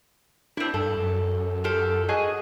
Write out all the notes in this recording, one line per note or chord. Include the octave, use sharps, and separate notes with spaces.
C4 D4 E4
G2 A4
F#2
F4 G4 A4
F#4 G#4 D#5